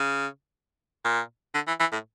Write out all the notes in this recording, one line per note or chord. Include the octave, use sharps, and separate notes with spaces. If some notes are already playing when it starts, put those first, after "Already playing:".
Already playing: C#3
A#2
D3
E3
E3
A2